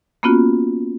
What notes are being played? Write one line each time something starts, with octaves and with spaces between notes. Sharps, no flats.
A#3 B3 C#4 F4 F#4